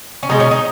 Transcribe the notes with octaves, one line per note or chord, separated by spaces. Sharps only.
C#4
B2 G#3 D#4
C#4
D#4